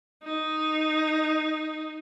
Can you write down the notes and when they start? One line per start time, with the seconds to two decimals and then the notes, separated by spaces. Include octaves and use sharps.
0.24 D#4